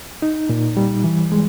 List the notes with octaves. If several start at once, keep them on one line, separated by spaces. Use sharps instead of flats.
D#4
A#2
G3
E3
G#3